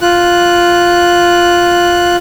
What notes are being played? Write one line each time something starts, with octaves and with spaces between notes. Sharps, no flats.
F4 F#6